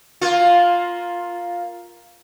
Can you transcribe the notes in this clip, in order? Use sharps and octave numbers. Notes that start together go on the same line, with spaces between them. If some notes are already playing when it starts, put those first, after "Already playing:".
A#3 F4